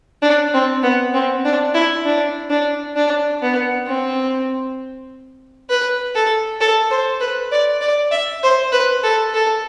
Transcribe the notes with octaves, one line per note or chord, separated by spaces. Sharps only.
D4
C4
B3
C4
D4
E4
D4
D4
D4
B3
C4
B4
A4
A4
C5
B4
D5
D5
E5
C5
B4
A4
A4